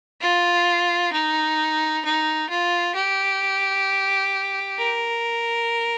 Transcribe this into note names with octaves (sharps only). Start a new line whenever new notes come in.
F4
D#4
D#4
F4
G4
A#4